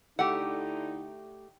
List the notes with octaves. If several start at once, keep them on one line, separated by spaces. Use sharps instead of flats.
D3 A3 D#4 E4 G4 F#5